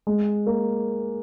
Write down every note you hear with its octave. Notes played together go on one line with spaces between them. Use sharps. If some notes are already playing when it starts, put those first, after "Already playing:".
G#3
A#3